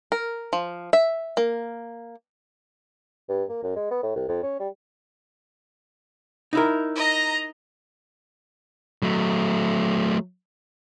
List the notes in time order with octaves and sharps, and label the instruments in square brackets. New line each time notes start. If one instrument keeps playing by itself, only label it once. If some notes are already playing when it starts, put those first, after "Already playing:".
[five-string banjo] A#4
F3
E5
A#3
[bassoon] G2
A#3
F#2
G#3
B3
A2
C2
F2
C#4
G3
[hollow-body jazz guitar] D#4 E4 A#4
[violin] D#5 A#5
[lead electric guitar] F#3 A3